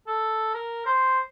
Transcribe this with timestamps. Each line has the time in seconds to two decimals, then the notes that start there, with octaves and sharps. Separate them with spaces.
0.07 A4
0.54 A#4
0.86 C5